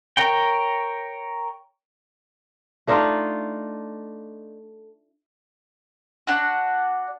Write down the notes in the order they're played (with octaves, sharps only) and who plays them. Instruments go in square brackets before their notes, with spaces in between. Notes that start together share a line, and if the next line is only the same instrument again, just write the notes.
[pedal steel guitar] A#4 C#5 G5
[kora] A3 D4 D#4 F4
[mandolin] D4 F#4